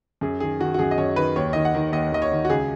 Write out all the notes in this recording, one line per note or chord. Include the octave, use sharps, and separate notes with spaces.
F#2 G#4
D#3 G#4
D#3 F#4
F#4
F#2 G#4
D#5
F#2 C#5
D#3 B4
D#2 C#5
D#3 D#5
F#5
D#3
D#2 D#5
D#2 D#5
C#5
D#3
F#4
C#2 G#4